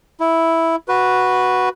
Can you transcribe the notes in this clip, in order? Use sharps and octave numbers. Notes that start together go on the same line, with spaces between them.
E4
F#4 B4